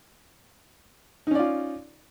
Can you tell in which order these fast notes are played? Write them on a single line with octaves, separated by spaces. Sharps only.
D#4 C#4 D5 F4